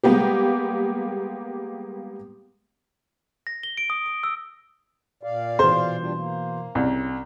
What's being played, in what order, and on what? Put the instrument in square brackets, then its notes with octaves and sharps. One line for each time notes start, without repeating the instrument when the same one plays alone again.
[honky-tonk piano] G3 G#3 A#3 B3 G4
[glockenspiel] A#6
G7
D7
D#6
D#6
E6
[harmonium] A#2 D5 F5
[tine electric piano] B2 E3 [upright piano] C5
[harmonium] G3 D4 F4
A#3
[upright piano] C2 [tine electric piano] C#4